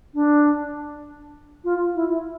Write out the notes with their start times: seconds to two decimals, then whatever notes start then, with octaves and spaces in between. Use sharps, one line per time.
0.14 D4
1.64 F4
1.95 E4